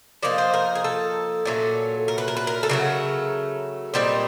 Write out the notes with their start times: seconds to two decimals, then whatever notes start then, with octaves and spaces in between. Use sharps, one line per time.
0.23 F3 A#3 D#4 D5
0.38 C5
0.54 A#4
0.75 G#4
0.84 A4
1.45 A#2 F#3 A3 C#4
2.08 A#4
2.18 B4
2.28 A#4
2.37 B4
2.47 A#4
2.63 A4
2.69 C#3 F#3 A3 A#4
3.94 A#2 G3 C4 D#4